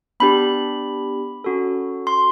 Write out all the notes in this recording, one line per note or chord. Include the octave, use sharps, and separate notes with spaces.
B3 D4 G4 B5
C#4 F#4 A4
C6